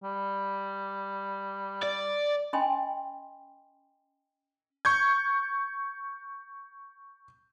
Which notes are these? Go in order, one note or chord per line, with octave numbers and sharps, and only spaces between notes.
G3
D5
C#4 D#5 G5 G#5 B5 C6
C#6 G6 G#6